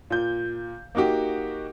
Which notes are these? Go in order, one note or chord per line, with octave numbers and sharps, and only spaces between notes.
A#2 G6
A#3 D#4 F#4 G4